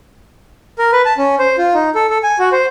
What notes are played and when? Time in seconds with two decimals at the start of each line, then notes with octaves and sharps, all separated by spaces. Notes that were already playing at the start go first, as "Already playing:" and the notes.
0.79 A#4
0.92 B4
1.05 A5
1.18 C#4
1.39 C5
1.58 F4
1.74 D#4
1.95 A4
2.10 A4
2.23 G#5
2.39 F#4
2.52 C5